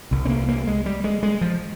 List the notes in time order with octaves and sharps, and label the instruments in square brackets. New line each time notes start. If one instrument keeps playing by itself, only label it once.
[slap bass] C2 C3
C4
A#3
A#3
G#3
G3
G#3
G#3
F3